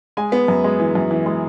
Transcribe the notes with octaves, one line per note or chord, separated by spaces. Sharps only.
G#3 G#5
B3
F#2
G#3
E3
F#2
E3
G#3